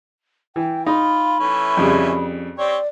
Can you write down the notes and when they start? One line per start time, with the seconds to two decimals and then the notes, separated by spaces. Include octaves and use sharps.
0.56 E3 G5
0.86 D#4 F4 B5
1.40 E3 A3 C#4
1.77 F2 C#3 G3
2.58 C4 G4 C#5 D5